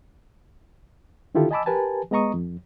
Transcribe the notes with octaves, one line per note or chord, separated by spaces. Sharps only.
D3 D#3 E4 F4 G4 A4
D#5 G#5 A5 B5 D6 E6
G4 A#4 B4 G#5 A5
G#3 B3 D#5 A#5 C#6 D#6
F2